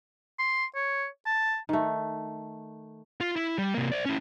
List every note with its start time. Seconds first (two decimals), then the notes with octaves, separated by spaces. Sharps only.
0.39 C6
0.76 C#5
1.26 A5
1.69 D#3 A3
3.21 F4
3.36 E4
3.58 G3
3.74 C3 A#3
3.92 C5 D5
4.05 C#4 E4